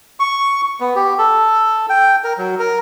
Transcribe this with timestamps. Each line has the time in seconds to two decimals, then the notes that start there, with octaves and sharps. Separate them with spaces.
0.20 C#6
0.80 B3
0.96 G4
1.18 A4
1.89 G5
2.24 A#4
2.38 F#3
2.59 A#4